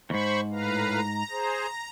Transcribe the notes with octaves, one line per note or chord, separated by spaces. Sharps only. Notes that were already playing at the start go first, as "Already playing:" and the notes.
D#2 G#2 C5 B5 C#6
A2 B4 F5 A#5
G#4 C5